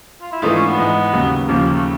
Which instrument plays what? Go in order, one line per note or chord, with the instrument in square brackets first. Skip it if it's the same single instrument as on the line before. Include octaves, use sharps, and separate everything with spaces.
[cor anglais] F4
E4
[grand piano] G#2 E3 A3 D4 F4 [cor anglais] D#4
[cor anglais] C#4
B3
[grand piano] G#2 E3 G#3
D#2 C#3 F#3
[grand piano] D#2 C#3 F3 [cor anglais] A#3
[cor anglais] A3